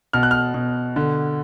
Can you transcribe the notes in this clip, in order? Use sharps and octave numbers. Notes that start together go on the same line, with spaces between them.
B2 F6
F#6
F6
B2
D3